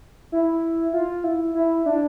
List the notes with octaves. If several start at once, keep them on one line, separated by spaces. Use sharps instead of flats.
E4
F4
E4
E4
D4